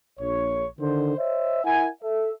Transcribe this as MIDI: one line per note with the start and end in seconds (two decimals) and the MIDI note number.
0.20 0.66 34
0.20 0.66 73
0.79 1.14 50
0.79 1.14 51
0.79 1.14 72
1.18 1.60 72
1.18 1.60 73
1.18 1.60 75
1.18 1.60 76
1.64 1.88 64
1.64 1.88 70
1.64 1.88 78
1.64 1.88 80
2.03 2.32 69
2.03 2.32 76